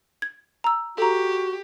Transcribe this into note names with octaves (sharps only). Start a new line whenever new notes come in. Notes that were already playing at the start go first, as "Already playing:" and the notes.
G#6
A#5 E6
F#4 G4 A4 A#5